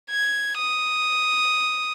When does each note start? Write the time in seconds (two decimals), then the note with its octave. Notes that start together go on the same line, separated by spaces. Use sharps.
0.10 G#6
0.59 D#6